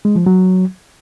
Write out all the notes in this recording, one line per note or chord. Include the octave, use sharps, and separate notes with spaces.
G#3
F3
F#3